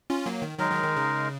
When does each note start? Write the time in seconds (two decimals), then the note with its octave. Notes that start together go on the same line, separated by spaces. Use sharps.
0.10 C#4 F4
0.26 F#3 A#3
0.42 D#3
0.58 D#3 F#3 G#3 D#4 A#4
0.71 D#3 F#3
0.83 D#3
0.97 C#3